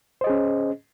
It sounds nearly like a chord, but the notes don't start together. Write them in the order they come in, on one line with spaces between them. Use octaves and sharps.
C5 D#5 G#4 C#4